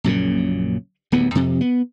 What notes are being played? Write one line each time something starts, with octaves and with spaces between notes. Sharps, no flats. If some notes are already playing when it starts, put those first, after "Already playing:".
A#1 F#2 A#2 C#3
D1 D#2 B3
F2 C3
B3